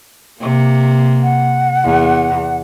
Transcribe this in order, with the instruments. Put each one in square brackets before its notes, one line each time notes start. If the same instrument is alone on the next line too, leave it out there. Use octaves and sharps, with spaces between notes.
[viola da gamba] C3 A#3
[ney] F#5
[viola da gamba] E2